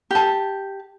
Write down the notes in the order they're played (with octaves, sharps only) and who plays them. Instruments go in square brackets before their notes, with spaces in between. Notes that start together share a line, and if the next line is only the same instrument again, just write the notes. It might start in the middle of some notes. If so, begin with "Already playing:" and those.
[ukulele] G4 A5